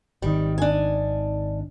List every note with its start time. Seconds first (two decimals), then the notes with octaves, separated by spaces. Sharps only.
0.22 G#1 D#3 G3
0.58 D4 G#5